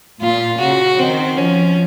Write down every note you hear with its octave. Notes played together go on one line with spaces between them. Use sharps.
A#2 F4
C#3 F#4
D#3 C4
F3 C#4